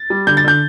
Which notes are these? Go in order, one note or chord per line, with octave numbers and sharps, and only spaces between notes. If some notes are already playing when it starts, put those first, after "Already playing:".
Already playing: A6
G3
D3 G6
A6
D3 G6